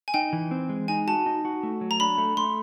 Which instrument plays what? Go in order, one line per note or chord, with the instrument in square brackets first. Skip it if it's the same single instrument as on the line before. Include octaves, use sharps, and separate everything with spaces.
[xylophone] G#5
[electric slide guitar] D#4 [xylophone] G5
[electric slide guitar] E3
C4
G#3
[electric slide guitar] D#4 [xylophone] G#5
[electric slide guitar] F#4 [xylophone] A5
[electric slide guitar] D#4
F#4
A3
F#3
[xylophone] A#5
[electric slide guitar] D4 [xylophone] B5
[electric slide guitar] A3
[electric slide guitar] A3 [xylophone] C6